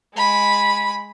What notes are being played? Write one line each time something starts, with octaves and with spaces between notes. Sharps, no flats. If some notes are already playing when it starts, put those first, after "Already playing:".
G#3 B5